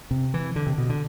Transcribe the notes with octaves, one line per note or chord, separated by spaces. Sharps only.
C3
E3
D3
C3
B2
D3